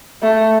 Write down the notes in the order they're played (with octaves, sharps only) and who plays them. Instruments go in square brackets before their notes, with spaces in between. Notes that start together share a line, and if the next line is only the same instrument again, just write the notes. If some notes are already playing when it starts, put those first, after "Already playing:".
[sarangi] A3